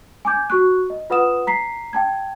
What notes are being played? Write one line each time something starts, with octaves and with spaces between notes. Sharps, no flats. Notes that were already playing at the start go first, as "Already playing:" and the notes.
G#5 D6 G6 G#6
F#4 C#6 F#6
D#5
F4 B4 F#5 D#6 E7
A#5 B6 C7
G5 A5 G#6